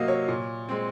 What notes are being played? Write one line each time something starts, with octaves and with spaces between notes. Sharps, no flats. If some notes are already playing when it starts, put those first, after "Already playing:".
Already playing: C3 F#3 A#3 D#5 F5
C#5
A#2
G#3 C4